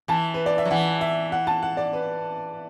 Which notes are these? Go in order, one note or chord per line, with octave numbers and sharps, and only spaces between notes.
E3 A5
B4
D5
E5
F#3
E3 F#5
E5
F#5
A5
F#5
D5
B4